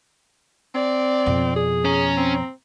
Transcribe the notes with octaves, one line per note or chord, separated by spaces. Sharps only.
C4 D5
F2 B2
G#4
C#4 A#5
C4